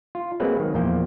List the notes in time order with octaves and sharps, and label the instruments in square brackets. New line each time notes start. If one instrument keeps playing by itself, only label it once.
[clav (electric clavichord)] F4
F#3 G#3 A#3 C4 B4
D#3
E2 A#2 F3 A#3 G5